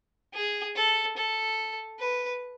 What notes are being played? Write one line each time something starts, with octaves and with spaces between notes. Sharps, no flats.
G#4
A4
A4
B4